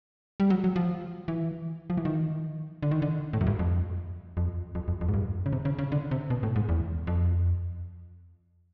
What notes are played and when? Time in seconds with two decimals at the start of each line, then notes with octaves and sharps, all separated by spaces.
0.40 G3
0.50 F#3
0.64 F#3
0.76 F3
1.28 E3
1.90 F3
1.97 E3
2.05 D#3
2.83 D3
2.91 D#3
3.02 D3
3.33 A2
3.41 F#2
3.47 G2
3.59 F2
4.37 F2
4.75 F2
4.88 F2
5.01 F2
5.08 G#2
5.14 G2
5.46 C#3
5.53 C3
5.65 C#3
5.79 C#3
5.92 D3
6.11 C3
6.30 B2
6.43 A2
6.56 G#2
6.69 E2
7.07 F2